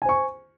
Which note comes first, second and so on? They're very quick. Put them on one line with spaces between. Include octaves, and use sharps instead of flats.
G#5 C5 C#6